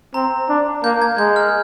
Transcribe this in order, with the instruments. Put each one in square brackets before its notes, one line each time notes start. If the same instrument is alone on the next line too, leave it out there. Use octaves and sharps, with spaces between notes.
[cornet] C4 [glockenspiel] A#5
[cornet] D4
[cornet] A#3 [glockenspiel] G6
[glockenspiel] G#6
[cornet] G#3 [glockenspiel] G6
[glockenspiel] F6